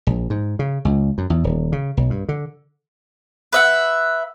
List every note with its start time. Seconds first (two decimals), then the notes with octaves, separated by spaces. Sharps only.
0.07 A#1
0.30 G#2
0.59 C#3
0.85 C#2
1.18 F#2
1.30 E2
1.44 D#1
1.72 C#3
1.97 B1
2.10 G2
2.29 D3
3.53 B4 E5 F#5